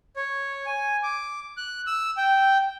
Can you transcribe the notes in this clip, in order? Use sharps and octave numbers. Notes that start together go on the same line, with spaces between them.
C#5
G#5
D6
F#6
E6
G5